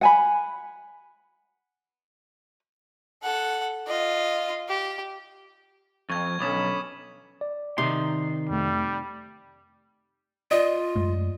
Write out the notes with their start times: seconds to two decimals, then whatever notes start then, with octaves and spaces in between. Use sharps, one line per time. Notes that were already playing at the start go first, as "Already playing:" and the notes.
0.01 F#5 G#5 B5
3.23 A4 F#5
3.87 F4 D#5
4.68 G4
6.10 F2 C#6 G#6
6.40 B1 D3 C#4 B5 D6 D#6 E7
7.41 D5
7.78 C3 D#3 D#4 C6
8.50 F2 G3 A3
10.51 F4 D5 D#5
10.96 F#2 G#3 A3